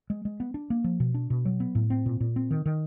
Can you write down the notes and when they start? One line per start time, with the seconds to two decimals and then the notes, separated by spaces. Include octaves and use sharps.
0.10 G#3
0.25 G#3
0.40 B3
0.54 D4
0.70 A#3
0.84 F3
1.00 B2
1.14 D4
1.30 B2
1.45 F#3
1.60 B3
1.75 A2
1.90 C4
2.06 A#2
2.20 A#2
2.36 C4
2.51 D#3
2.66 D#3